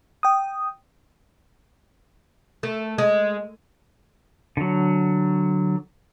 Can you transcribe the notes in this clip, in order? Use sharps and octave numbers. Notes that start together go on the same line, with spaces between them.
G5 D#6
A3
G#3
D3 F#3